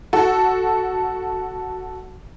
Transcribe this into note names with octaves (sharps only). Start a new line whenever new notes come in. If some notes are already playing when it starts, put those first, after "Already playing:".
F#4 A4